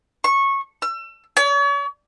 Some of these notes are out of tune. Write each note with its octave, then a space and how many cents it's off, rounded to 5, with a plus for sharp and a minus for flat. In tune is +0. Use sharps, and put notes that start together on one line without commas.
C#6 -15
E6 +35
C#5 +40